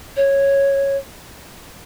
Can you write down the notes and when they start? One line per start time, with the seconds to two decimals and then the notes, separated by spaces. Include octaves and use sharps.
0.16 C#5